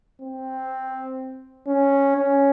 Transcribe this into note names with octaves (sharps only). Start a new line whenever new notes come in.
C4
C#4
C#4